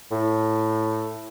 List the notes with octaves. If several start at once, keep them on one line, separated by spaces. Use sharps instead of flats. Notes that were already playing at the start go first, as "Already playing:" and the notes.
A2